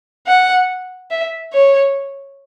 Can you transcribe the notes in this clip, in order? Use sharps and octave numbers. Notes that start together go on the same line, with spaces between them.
F#5
E5
C#5